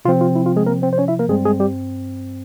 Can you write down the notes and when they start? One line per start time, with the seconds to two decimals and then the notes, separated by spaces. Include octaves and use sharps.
0.05 C3 F3 C4 F4
0.21 F4
0.36 E4
0.46 F4
0.56 G#3 G#4
0.66 A#3 A#4
0.82 C4 C5
0.93 C5
0.98 C#4 C#5
1.08 E4 E5
1.19 A#3 A#4
1.29 G2 G3 G#3 C4 G#4
1.45 G#3 G#4
1.60 G3 G4